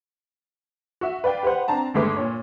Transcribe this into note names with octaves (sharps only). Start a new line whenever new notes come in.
F#4 E5
B4 D5 F5 G5
G4 B4 C5 F#5
C4 D4 A5 A#5
G1 D#2 G#3 A3 B4 D6
A#2 C#5